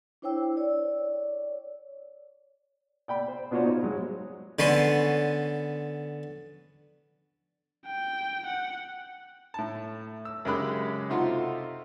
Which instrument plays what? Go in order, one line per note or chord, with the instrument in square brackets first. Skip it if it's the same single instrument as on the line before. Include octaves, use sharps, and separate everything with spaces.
[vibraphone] D4 E4 C5 C#5 G5 E6
C#5 D5
[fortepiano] D5 G5 B5
C5
B3 D4 F4 F#4 C5 C#5
D#4 C#5
F#3 G#3
[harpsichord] D3 B3 C#4 C6
[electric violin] G5
F#5
[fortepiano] A2 A5
E6
F#2 C#3 G#3 G4 B5 F#6
C3 C4 D#4 F4 F#4 A4